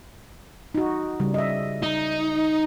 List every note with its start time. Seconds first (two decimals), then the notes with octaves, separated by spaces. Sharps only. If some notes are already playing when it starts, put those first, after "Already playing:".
0.75 D#4 F#4
1.20 C#3 G3
1.34 D#5 E5
1.83 D#4